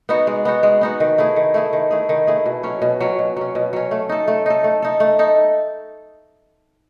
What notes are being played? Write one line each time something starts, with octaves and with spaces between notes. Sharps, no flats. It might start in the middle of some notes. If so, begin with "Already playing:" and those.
B3 D#4 F#4
G#3
B3 D#4 F#4
G#3
B3 D#4 F#4
D#3
A3 E4 G#4
D#3
A3 E4 G#4
D#3
A3 E4 G#4
D#3
A3 E4 G#4
B2
F#3 C#4
B2
F#3 C#4
B2
F#3 C#4
B2
F#3 C#4
A3
D#4 A4
A3
D#4 A4
A3
D#4 A4
A3
D#4 A4